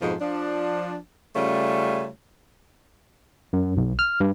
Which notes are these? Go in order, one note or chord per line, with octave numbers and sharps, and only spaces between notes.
F2 G#2 B2 F3
F3 D4
C#3 G3 A3 C#4 F4
F#2
B1
F6
G2